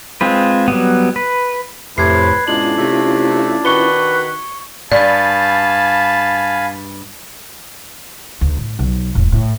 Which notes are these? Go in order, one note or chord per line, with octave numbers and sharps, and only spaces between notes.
G#3 C4 F4 B4
F#3 G3 B3
B4
F2 A2 C3 B4 G#6 C7
G#2 B2 G#3 C#4 D4 E4 F4 F#7
C3 A3
D#3 F#4 B4 C#6 C#7 G7
G2 D5 F5 G#5 A5 B5
D2
A2
B1
E1 A2
A2